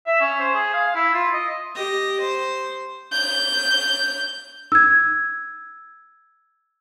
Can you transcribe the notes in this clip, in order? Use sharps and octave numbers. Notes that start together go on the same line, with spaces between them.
E5
C#4
C5
G#4
F5
E4
F4
D#5
G4 D#5
C5
G6
E6 G#6